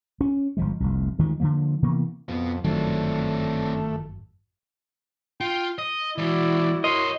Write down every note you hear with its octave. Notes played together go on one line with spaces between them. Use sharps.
C#4
G1 F3 G#3
F1 C2
D2 D#3 F3 G#3
D3 D#3 F3 A#3
C3 E3 A#3 B3
F2 B2 B3
G1 F#2 D#3 F3 F#3 A3 C4 D4
F4 G5
D#5 D#6
E3 G#3 E4 F#4 D5
A#4 C#5 D#5 C6